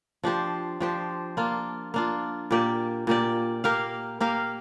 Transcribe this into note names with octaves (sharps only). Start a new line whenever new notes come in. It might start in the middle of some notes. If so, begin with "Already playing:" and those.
F3 D4 G4 C5
F3 D4 G4 C5
A#3 D4 F4
A#3 D4 F4
A#2 A#3 G4 D5
A#2 A#3 G4 D5
A#3 G4 A#4 F5
A#3 G4 A#4 F5